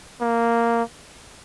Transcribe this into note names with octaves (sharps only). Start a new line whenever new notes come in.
A#3